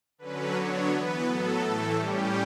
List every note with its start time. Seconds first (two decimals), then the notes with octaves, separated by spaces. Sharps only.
0.18 D3 F#3 C#4 B4
0.53 D3 F#3 B3 C#5
0.89 E3 B3 B4
1.24 A2 F#3 B3 A4
1.59 A2 E3 A3
1.93 A2 G3 C#4 G4